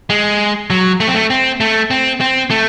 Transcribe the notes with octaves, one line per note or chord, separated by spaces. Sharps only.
G#3
F#3
A3
C4
A3
C4
A3
C4
C4
A3